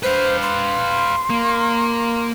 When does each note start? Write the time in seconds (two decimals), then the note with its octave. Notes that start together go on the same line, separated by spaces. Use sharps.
0.03 B4 C5 F5
0.42 C6
1.30 A#3